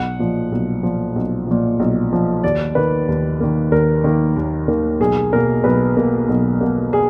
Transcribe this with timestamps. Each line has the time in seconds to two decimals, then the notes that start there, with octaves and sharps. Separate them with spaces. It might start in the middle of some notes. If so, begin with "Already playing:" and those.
Already playing: B1 F#5
0.19 A#2 F3
0.52 B1
0.83 A#2 F3
1.16 B1
1.47 A#2 F3
1.80 B1
2.11 A#2 F3
2.44 D#2 D5
2.75 D#3 A#3 B4
3.08 D#2
3.40 D#3 A#3
3.72 D#2 A#4
4.04 D#3 A#3
4.37 D#2
4.68 D#3 A#3
5.00 B1 G#4
5.33 B2 A#3 A#4
5.64 B1 B4
5.97 B2 A#3
6.29 B1
6.61 B2 A#3
6.93 G#4